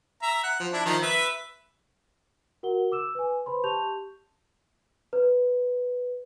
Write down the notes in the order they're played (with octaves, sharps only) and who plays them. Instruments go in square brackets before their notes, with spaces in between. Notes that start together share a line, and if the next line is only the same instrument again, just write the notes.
[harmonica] E5 A#5
F#5
F3
D4 E4
D#3 F3 A#5
B4 E5
[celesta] F#4 A#4 F#5 G7
D6 E6 E7
B4 G#5
B4 C5 B5 C6
G4 A5 C6 C#6 G6 F7
B4